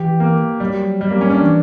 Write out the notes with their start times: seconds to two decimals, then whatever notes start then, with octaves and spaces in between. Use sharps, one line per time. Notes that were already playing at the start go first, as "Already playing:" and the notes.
Already playing: E3 G4
0.20 A#3
0.60 F#3 G3
1.01 G3
1.10 A#3
1.21 C#4
1.30 D4
1.41 E3